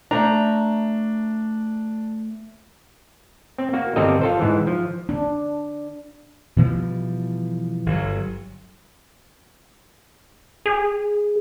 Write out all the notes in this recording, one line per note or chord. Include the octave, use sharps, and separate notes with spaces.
A3 D4 A#5
C4
A#3 F#4
G1 G3 C4 A4 A#4 D#5
F4 A4 C5
G#2 E3
F3
D4
B2 E3 F3 G3
G1 F#3
G#4